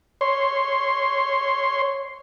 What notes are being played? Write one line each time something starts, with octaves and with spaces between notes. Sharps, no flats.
C#5 C6